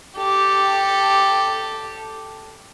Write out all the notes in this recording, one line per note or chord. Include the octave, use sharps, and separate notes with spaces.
G4 A4